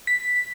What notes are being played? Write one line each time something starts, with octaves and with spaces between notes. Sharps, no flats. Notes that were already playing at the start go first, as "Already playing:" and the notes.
B6